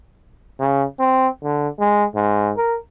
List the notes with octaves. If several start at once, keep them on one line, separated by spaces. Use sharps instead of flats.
C#3
C4
D3
G#3
G#2
A#4